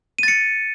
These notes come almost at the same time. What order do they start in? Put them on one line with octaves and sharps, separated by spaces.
D#7 A6 C#7